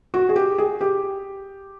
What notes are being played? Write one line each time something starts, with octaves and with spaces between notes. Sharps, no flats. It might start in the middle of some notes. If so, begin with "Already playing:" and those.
F#4
G#4
G4
G#4
G4